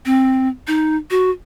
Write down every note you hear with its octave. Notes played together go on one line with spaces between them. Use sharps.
C4
D#4
F#4